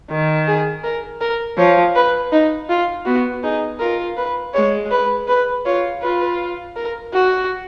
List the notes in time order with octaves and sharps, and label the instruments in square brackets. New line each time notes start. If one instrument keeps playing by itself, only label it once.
[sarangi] D#3
[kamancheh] G#4
A#4
A#4
[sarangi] F3 [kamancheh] C#5
[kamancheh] B4
D#4
F4
[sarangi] B3 [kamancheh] F#4
[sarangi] D#4 [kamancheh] G#4
[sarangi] F4 [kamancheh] A#4
[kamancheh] B4
[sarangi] G#3 [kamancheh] C#5
[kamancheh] B4
B4
[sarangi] F4 [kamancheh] C#5
[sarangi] F4 [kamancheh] B4
[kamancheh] A#4
F#4